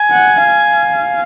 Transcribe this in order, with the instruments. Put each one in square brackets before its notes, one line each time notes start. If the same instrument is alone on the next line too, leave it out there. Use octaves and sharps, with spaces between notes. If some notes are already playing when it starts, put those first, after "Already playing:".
Already playing: [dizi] G#5
[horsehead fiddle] F#5
F5